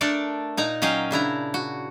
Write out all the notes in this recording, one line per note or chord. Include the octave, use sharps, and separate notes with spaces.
A3 D4 A4 A#4 D5
A#2 D#4 A#5
F#3 C#4 D#5 F5 G5
C#3 D4 E4 A#5
F#4